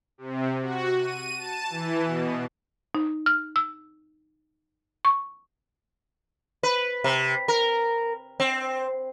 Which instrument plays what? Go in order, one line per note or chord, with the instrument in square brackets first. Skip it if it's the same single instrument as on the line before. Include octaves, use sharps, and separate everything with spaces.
[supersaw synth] C3
F#4
D#7
A5
E3
B2
[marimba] D#4
F6
E6
C#6
[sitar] B4
C3
A#4
C4